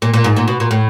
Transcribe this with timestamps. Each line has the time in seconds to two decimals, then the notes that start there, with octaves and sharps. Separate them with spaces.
0.02 A#2
0.14 A#2
0.24 G#2
0.37 A#2
0.48 B2
0.60 A#2
0.71 A2